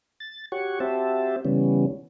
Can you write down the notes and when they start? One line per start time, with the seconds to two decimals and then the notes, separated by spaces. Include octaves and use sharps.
0.20 A6
0.52 F#4 G4 C#5 F#5 C#6
0.80 C4 F#4 G4 C5 E5 A5
1.45 C#3 E3 G3 B3 C#4